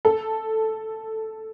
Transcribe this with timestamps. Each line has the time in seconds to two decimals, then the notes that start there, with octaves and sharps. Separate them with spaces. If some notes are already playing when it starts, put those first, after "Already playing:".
0.05 A4